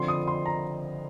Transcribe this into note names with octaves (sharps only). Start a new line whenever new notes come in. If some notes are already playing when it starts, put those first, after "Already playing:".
Already playing: D3 F3 C4 C6
D#6
C6
A#5